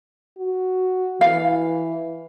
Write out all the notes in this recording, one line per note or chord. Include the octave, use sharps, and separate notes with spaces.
F#4
E3 F5